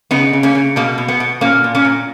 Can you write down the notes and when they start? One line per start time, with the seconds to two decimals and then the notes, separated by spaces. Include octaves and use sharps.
0.11 C#3 B3 D#4
0.33 C#3
0.43 A#3 C#4
0.55 C#3
0.76 B2 A#3
0.98 B2
1.08 B3
1.20 B2
1.41 A#2 A#3 C#4
1.64 A#2
1.75 A#3 C#4
1.85 A#2